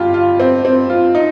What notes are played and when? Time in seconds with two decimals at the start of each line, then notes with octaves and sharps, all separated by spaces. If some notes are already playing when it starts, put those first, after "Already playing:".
Already playing: G2 F4 G4
0.14 F4
0.40 C4
0.65 C4
0.90 F4
1.15 D#4